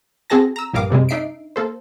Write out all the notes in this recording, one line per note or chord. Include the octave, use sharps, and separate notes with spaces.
C4 F#4 G#4 A4 A5 A#6
A#5 E6
A#1 G2 A#4 F5 D6 D#6
F#2 C3 G3 G#3
D4 D#4 E5 C7 D7
A#3 A4 C5